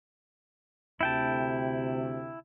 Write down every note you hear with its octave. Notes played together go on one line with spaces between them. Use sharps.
D2 C3 E4 G5 A5